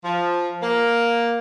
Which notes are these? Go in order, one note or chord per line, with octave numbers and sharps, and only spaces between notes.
F3
A#3